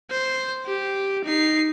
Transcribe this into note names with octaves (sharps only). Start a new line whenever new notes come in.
C5
G4
D#4 C7